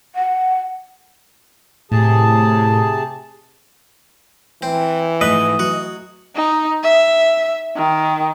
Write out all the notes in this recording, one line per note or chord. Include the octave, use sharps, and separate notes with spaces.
F#5
A2 C3 G#4 A5
E3 C4
G#2 F3 A3 B4 D#5
F#3 F#4
D#4
E5
D#3